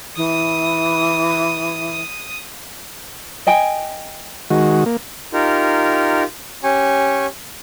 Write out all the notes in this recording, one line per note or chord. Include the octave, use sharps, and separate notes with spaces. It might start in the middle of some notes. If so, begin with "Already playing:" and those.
E3 D#6
D#5 G5 G#5
D#3 G#3 F#4
A#3
D#4 F4 G4 A#4
C#4 G4 G#5 C#6